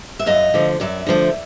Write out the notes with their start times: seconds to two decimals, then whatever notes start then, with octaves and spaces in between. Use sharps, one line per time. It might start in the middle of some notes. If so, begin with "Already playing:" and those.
0.19 E5
0.26 F#2 D#5 F5
0.54 D3 F3 A3
0.80 F#2 D5 E5
1.07 D3 F3 A3